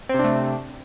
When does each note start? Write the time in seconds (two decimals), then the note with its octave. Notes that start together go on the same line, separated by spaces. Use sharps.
0.09 C4
0.14 C3
0.19 D4
0.24 A3